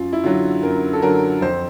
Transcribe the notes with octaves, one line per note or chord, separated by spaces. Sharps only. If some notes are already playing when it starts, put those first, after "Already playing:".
Already playing: F#2 F4
E4
D3 F#3 F4
F#2 A#4
A4
D3 F#3 A#4
F2 C5